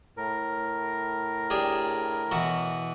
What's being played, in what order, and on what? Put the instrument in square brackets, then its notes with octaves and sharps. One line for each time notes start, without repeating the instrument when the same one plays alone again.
[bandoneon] A2 A#4
[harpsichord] D4 G4 G#4
B2 E3 F#4